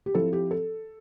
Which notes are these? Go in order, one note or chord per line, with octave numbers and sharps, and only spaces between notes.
G4
F3 C4 E4 A4
G4
A4